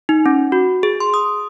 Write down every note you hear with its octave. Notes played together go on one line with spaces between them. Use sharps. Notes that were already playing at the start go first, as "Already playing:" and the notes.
D#4
C#4
F#4
G#4
C6
D#6